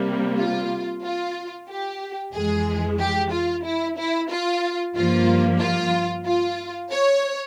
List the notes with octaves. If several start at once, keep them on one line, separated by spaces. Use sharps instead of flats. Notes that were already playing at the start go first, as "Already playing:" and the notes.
Already playing: C3 G3 A#3
F4
F4
G4
F2 E3 G#3 G#4
G4
F4
E4
E4
F4
G2 F3 A#3 F4
F4
F4
C#5